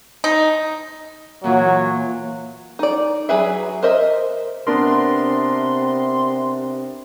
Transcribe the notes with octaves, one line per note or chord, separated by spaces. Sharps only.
D#4
A#2 E3 F#3 F4
D#4 D5
F#3 G#4 B4 E5
A#4 C5 D#5 E5
C3 B3 D4 A#4 C6